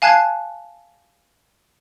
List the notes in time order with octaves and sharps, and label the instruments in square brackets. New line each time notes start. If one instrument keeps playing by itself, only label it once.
[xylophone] F5 G#5 A5 F#6 G#6 C7